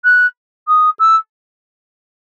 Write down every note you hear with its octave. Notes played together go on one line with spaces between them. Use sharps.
F#6
D#6
E6